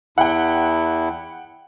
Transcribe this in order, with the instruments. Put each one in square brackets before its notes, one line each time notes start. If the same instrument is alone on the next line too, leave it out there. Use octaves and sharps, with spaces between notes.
[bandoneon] E2 E4 [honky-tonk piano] F#5 G5